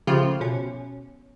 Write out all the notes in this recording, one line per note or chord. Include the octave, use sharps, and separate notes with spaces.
C#3 F3 A3 F4 G4
B2 C#4